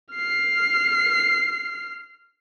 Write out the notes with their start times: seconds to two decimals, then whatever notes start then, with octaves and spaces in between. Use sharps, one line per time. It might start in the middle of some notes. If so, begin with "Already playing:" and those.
0.14 F6 C7